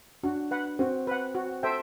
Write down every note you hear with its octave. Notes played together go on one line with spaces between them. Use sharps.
D4 F#4
B4 F#5
C4 F#4
B4 F#5
F#4
A4 C5 E5 G5